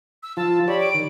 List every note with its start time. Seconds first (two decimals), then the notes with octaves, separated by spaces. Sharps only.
0.23 E6
0.37 F3 F4 A5
0.68 G4 C#5 D5 B5
0.81 D7
0.94 D#3